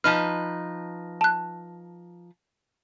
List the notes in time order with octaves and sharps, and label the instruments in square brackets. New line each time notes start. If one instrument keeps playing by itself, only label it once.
[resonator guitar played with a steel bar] F3 D#4 B4 [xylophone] F6
[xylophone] A5 F#6